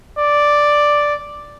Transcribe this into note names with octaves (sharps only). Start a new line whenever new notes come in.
D5